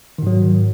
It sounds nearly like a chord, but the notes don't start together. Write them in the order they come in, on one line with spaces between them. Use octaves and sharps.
D#3 G#2 F#3